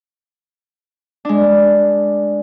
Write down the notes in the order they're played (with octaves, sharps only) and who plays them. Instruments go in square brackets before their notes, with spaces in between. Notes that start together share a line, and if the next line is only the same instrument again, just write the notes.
[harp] G#3 D4